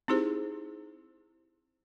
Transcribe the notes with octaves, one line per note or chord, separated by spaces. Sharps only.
C4 D#4 E4 G4 G#4 C5